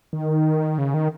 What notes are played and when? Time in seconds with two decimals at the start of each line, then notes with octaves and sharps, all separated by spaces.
0.13 D#3
0.78 C#3
0.94 D#3